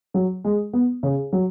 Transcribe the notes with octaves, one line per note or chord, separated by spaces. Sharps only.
F#3
G#3
B3
C#3
F#3